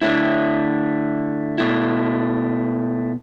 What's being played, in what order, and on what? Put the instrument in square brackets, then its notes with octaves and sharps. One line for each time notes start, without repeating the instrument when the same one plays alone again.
[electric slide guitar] D3 A3 E4
B2 A3 E4